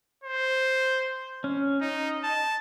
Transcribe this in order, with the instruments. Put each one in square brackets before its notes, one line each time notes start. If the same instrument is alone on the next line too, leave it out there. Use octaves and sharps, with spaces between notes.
[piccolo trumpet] C5
[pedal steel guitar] C#4
[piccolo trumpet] D#4 [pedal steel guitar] D#5
[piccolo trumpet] A5